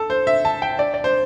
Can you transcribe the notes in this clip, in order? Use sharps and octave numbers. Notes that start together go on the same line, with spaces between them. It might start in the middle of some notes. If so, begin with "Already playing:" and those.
Already playing: A4
C5
E5
A5
G5
D5
D5
C5